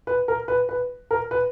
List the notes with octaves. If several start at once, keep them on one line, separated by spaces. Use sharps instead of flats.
B4
A#4
B4
B4
A#4
B4